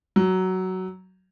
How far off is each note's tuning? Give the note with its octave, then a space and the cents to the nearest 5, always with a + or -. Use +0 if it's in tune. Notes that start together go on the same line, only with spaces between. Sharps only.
F#3 +10